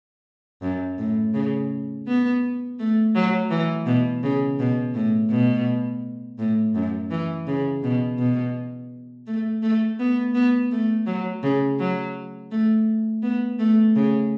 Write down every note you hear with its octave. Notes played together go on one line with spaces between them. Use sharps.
F#2
A2
C#3
B3
A3
F#3
E3
B2
C#3
B2
A2
B2
A2
F#2
E3
C#3
B2
B2
A3
A3
B3
B3
A3
F#3
C#3
F#3
A3
B3
A3
C#3